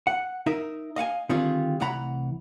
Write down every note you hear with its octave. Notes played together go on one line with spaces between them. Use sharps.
F#5
D#4 A#4 E5
D#5 F5 F#5 G#5
D3 D#3 G3 C4 F4 G#4
C2 E3 A3 F#5 A#5 B5